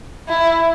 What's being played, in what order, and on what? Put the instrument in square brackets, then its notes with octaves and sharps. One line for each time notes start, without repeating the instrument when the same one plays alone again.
[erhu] E4